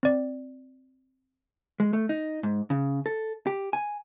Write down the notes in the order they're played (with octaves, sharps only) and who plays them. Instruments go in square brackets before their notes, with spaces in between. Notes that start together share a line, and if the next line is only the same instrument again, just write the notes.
[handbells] C4 D5
[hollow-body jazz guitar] G#3
A3
D#4
G#2
C#3
A4
G4
G#5